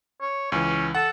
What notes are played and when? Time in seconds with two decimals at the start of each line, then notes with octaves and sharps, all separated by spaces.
0.21 C#5
0.52 C#2 E3 C#4
0.95 A4 F#5